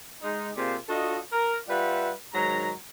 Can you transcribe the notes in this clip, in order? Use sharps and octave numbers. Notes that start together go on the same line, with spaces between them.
G#3 D#4
C3 A#3 F4 G#4 C5 D5
D4 F4 F#4 A4 D#5
A#4
G3 F4 B4 D5 E5 F#5
G#2 D#3 F#3 A#5